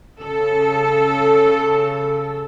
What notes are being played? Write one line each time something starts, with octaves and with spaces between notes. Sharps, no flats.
C#3 A4